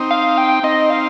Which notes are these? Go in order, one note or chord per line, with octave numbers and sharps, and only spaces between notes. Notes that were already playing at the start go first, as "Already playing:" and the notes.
Already playing: C4 D#4
F5
G5
C4 D#4 D#5
F5